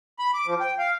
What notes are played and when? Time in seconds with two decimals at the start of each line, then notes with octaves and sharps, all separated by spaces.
0.19 B5
0.34 D6
0.47 F3
0.60 G5
0.79 F5